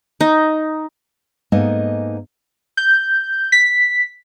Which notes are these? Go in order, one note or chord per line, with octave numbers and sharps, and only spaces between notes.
D#4
G#2 A#3 B3 D#4 A4 D#5
G6
B6